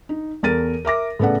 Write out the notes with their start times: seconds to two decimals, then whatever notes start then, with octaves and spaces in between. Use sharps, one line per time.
0.09 D#4
0.43 E2 A4 A#4 A6 D#7
0.85 A#4 E5 D6 A#6
1.19 A2 C#3 B3 A4 D5 F#5